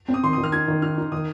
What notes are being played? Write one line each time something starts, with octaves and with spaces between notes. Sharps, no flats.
C4
D#6
D#3 C6
D#6
D#3
F6
D#4 G#6
D#3
D#4 F6
D#4
D#3 D#6